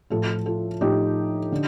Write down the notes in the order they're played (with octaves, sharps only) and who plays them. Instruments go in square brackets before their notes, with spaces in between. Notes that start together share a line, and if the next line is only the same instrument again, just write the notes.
[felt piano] A2 F3 F4 A4
F4 A4
A2 F3 D#4 G4
D3